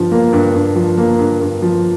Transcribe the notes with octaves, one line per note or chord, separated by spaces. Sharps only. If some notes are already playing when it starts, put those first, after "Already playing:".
Already playing: G2 F3
A#3
G2
G2
F3
A#3
G2
G2
F3